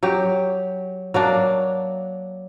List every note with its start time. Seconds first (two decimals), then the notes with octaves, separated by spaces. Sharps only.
0.03 F#3 G4
1.14 F#3 A#3 D4